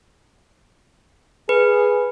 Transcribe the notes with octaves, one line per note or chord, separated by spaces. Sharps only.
G#4 B4